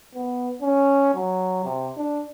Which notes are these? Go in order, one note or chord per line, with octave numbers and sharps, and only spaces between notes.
B3
C#4
F#3
C3
D4